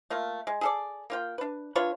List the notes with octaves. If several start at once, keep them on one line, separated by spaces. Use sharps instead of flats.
A3 A#3 F4
G#3
G#4 A4 D5
A#3 F4 G5
D4 B4
D3 F4 B4 C#5